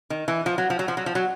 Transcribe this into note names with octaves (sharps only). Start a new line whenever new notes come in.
D#3
E3
F3
F#3
F3
F#3
F3
F#3
F3
F#3